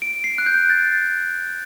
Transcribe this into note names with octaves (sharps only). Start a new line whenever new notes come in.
D7
C7
F#6
G6
A6